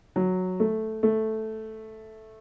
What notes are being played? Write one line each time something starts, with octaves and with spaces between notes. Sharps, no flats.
F#3
A3
A3